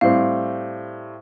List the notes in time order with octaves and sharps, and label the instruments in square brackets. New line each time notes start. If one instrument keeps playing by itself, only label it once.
[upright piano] A2 G3 C4 [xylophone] F5